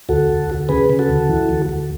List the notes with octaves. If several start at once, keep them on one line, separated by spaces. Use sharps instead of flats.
D2 F#4 A4
D2
D2
C#3 G#4 B4
C#3
F#4 A4
D2
E3
D2
D2